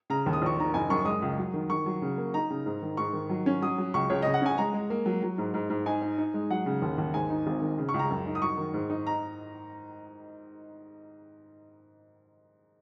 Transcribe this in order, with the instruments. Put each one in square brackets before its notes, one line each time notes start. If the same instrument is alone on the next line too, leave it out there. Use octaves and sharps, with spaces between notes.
[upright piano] C#3 A#5
D#2
D#6
A#1 C#6
D#3 A#5
F#1 G#5
F#2 C#6
G#3 D#6
C#2
F#3
D#3
D#3 C#6
F#3
C#3
A#3
D#4 A#5
C#3
G#2
D#3
G#2 C#6
D#3
F#3
C#4
F#3 D#6
F#3
C#2 C#6
C#2 C#5
C#3 D#5
F#5
C#4 G#5
G#3 A#5
G#3
A#3
F#3
F#3
G#2
G#2
G#2
D#4 G#5
D#4
D#4
G#3
F#3 F#5
C#3
D#2
D#2
G#2 G#5
D#4
G#1
D#3
C#3
C#6
C#2
A#5
F#2
D#4
D#6
F#3 C#6
D#3
G#2
D#4
A#5